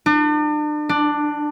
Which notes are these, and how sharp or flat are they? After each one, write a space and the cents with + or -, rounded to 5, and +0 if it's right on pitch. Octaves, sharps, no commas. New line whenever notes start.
D4 +40
D4 +10